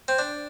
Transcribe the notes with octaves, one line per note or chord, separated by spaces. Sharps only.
C4
D4